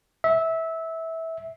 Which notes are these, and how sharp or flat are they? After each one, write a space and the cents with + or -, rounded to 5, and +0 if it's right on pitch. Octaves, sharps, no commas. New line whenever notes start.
E5 -20